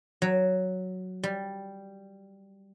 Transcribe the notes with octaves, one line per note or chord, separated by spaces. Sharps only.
F#3
G3